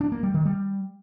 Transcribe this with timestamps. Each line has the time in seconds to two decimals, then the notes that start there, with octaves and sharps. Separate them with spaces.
0.01 D4
0.12 A#3
0.23 G3
0.34 D#3
0.45 G3